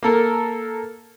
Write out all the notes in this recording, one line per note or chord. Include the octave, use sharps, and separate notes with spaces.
A#3 A4 A#4